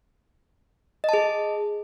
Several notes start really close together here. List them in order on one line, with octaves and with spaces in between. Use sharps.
D#5 A5 G#4